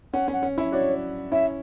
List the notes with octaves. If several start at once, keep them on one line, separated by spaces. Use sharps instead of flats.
C#4 F#5
C#4
F#5
C#4
C#4 E4
D4 F#4 C#5
C#4 E4 E5